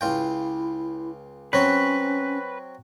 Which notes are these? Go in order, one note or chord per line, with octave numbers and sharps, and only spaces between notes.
C#2 E4 F4 G5
F#3 C4 C#4 B4 C#5